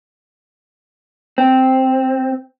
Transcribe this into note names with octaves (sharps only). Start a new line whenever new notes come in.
C4